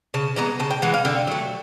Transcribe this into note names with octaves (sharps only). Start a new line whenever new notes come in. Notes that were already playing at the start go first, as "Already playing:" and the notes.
C#3 A5
E3 G#3 B3 A#5
C#3 A5
G5
E3 G#3 F#5
F5
D3 G5
F#3 A3